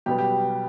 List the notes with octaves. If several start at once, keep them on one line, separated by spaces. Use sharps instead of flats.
B1 B2 G3 B3 G4
G4